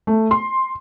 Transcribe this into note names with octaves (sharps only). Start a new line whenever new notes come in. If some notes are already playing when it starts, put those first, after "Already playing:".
A3
C6